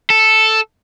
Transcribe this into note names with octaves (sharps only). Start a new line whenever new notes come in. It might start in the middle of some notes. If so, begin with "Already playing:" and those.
A4